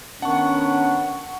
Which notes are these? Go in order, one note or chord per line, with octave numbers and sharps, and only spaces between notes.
D#3 B3 C#4 D4 F#5 C#6